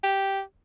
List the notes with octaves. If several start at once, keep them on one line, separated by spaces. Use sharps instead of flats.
G4